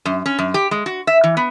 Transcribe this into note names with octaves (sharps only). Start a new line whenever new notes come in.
F#2
C#4
F#2
G4
G#3
F#4
E5
E3
B3